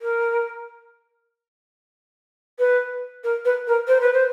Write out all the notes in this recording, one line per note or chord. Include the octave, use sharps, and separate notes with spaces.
A#4
B4
A#4
B4
A#4
C5
B4
C5